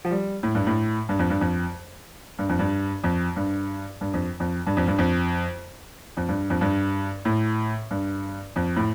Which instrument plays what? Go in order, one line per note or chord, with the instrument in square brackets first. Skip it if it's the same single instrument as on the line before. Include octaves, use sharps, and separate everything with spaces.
[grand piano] F3
G3
A2
G2
A2
G2
F2
G2
F2
G2
F2
G2
F2
G2
G2
F2
F2
G2
F2
G2
F2
F2
G2
F2
G2
A2
G2
F2
A2